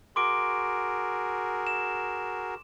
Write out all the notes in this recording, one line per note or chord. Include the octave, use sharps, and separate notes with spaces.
F#4 G#4 A#4 C6 D6 D7
E7